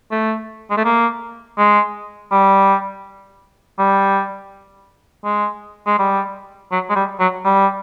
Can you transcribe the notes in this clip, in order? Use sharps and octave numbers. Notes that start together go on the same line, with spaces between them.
A3
G#3
A3
A#3
G#3
G3
G3
G#3
G#3
G3
F#3
G#3
G3
F#3
G3